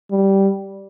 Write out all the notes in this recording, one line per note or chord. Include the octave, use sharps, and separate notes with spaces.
G3